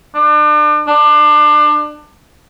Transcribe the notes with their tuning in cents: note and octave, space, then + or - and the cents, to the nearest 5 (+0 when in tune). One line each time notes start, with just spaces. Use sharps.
D4 +35
D4 +25